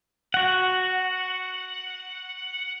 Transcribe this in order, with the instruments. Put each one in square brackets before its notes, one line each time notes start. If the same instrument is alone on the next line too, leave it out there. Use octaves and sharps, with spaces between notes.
[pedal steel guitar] F#4 F#5